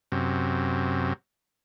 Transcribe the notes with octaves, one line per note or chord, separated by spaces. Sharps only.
F#2 C3